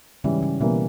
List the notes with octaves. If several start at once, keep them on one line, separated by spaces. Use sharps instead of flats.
G#2 C#3 E3 G3 C#4
C#3 C#4
B2 E3 G3 A#3 B3